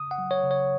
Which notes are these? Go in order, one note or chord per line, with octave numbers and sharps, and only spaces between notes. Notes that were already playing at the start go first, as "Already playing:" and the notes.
Already playing: C#3 D#6
F#5
F#3
C#5
C#3
C#5